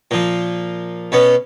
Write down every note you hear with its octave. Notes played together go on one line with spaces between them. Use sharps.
A#2 F3
B2 B3 C#4